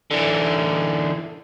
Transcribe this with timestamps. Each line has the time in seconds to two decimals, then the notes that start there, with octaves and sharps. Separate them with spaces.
0.11 D3 E3